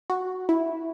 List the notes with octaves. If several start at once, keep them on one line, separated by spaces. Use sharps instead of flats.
F#4
E4